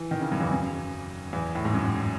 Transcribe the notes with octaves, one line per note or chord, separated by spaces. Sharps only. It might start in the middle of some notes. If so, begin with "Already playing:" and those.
Already playing: E3
D#3
C#3
F#2
E2
F#2
E2
A2
G#2
F#2